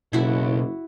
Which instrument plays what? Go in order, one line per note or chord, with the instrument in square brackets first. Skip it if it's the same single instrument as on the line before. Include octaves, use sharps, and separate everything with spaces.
[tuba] F#1 [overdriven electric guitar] B1 [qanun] E4 F#4